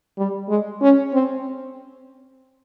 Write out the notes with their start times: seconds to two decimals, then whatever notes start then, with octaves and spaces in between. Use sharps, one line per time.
0.18 G3
0.49 G#3
0.81 C#4
1.14 C4